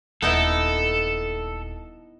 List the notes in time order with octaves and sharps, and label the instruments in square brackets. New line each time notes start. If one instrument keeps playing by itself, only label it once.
[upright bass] D#1 [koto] B3 D#4 E4 [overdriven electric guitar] A4